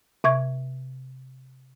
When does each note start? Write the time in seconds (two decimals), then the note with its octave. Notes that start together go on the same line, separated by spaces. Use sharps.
0.24 C3 E5 C#6 G#6